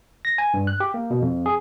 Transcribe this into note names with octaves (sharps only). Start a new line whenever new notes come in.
A#6
G#5
G2
F#6
G4
A#3
B2
F2
G#4